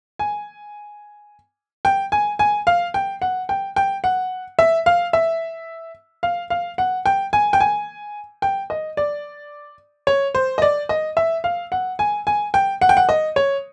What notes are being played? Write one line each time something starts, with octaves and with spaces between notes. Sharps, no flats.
G#5
G5
G#5
G#5
F5
G5
F#5
G5
G5
F#5
E5
F5
E5
F5
F5
F#5
G5
G#5
G5
G#5
G5
D#5
D5
C#5
C5
D#5
D5
D#5
E5
F5
F#5
G#5
G#5
G5
F#5
G5
F#5
D#5
C#5